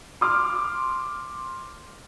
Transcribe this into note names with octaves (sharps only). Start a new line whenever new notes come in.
C6 D6 F6